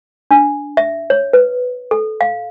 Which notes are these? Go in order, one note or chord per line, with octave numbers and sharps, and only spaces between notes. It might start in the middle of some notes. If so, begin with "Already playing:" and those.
D4
E5
C#5
B4
A4
F5